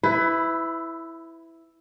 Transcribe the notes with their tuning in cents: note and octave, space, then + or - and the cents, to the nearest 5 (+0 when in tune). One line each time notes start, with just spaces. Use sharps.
E4 +0 B4 +30